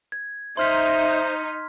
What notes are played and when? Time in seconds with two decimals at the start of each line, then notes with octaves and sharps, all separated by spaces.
0.12 G#6
0.57 D#4 C5 E5 C6 F6 B6